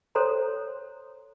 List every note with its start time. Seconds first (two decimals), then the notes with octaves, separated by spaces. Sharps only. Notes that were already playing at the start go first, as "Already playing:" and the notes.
0.15 A4 C5 C#5 A#5 C6